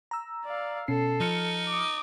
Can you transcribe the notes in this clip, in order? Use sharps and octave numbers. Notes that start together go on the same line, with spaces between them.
A#5 E6
D5 F5
B2 C#4 A4 C7
F3 D#4 F6 C#7
D6 D#6